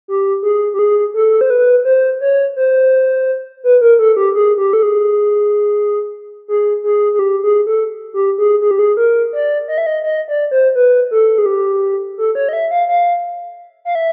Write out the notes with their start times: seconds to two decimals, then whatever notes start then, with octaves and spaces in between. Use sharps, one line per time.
0.08 G4
0.43 G#4
0.74 G4
0.79 G#4
1.14 A4
1.41 C5
1.50 B4
1.85 C5
2.21 C#5
2.56 C5
3.64 B4
3.81 A#4
3.99 A4
4.17 G4
4.35 G#4
4.58 G4
4.73 A4
4.83 G#4
6.48 G#4
6.84 G#4
7.14 G#4
7.19 G4
7.44 G#4
7.67 A4
8.14 G4
8.38 G#4
8.61 G#4
8.71 G4
8.79 G#4
8.97 A#4
9.33 D5
9.68 D#5
9.78 E5
9.86 D#5
10.04 D#5
10.28 D5
10.51 C5
10.75 B4
11.11 A4
11.38 G#4
11.46 G4
12.18 A4
12.35 C#5
12.49 D#5
12.53 E5
12.71 F5
12.88 F5
13.85 F5
13.95 E5